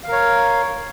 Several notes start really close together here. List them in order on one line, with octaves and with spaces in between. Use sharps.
F5 A#4 C#5